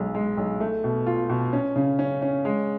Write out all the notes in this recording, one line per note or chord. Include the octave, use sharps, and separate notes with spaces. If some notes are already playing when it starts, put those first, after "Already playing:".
Already playing: B1 G#3
G#3
B1
A3
B2
F4
B2
C#4
C#3
C#4
C#4
G#3